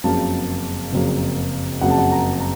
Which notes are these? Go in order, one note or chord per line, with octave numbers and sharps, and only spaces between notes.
F#1 F2 C#3 F#3 A#3 A5
F#1 F2 C#3 F#3 A#3
F#1 F2 C#3 F#3 A#3 F#5
A5
F#5
A#5
A#5